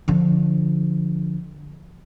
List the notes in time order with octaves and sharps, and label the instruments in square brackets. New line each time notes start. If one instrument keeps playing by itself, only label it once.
[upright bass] D3 F3